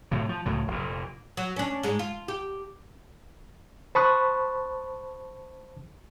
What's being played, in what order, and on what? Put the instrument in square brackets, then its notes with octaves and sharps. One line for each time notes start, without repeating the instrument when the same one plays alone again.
[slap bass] A2 C3 F#3
F3
C#2 A2 F#3
F1 A#2
[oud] F#3
C#4 D4
G#2 G#3
F4
G4
[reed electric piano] C5 A5 B5 C#6 D#6 F#6